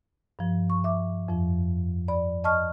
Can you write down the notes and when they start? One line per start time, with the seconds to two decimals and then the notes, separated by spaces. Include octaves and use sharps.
0.39 G2 F3
0.70 C#6
0.84 E5 D6
1.28 F2 F3
2.08 D5 B5
2.44 D#5 A5 C#6 F6